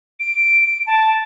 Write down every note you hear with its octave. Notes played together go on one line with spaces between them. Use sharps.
D7
A5